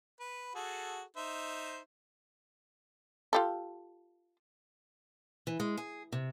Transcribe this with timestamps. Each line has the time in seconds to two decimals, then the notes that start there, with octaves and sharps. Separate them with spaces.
0.20 B4
0.55 F#4 G#4 A4
1.16 D#4 C5 E5
3.33 F4 G4 A4
5.47 E3
5.60 G#3
5.77 G#4
6.12 C3